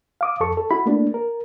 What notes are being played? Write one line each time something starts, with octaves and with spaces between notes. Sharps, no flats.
F5 D6 D#6
F2 A4 C#6
A4
E4 F#4 B5
A3 A#3 D4
A#4